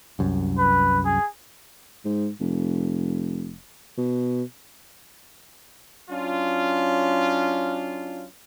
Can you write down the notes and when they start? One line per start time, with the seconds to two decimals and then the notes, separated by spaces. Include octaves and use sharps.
0.19 C2 F#2
0.58 B4
1.05 G#4
2.05 G#2
2.40 F1
3.97 B2
6.10 F#3 C#4 D4 F4